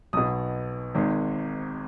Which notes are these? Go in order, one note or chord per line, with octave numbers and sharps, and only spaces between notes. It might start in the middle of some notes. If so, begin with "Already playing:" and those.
B1 B2 D#6
G#1 G#2 D#3